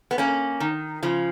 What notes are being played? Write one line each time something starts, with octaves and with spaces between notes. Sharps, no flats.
B3
A#3 C#4
D#3
C#3 F3